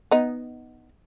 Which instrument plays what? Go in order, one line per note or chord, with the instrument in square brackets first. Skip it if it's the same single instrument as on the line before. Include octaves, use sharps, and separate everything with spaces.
[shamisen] B3 D#4